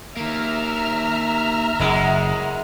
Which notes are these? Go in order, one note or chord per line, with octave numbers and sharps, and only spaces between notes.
D#3 A#3 E5 A#5 F6
F#1 F#2 G#3 E4